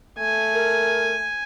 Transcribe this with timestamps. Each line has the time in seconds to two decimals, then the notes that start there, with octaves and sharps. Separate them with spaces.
0.19 A3 G#5
0.52 A#4